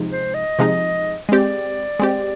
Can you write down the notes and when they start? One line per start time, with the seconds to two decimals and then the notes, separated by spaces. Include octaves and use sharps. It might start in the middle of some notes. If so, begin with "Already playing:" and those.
Already playing: C3 F3 G#3 D#4
0.12 C5
0.35 D#5
0.59 C3 F3 G#3 D#4
1.29 G#3 C4 G4 D5
2.00 G#3 C4 G4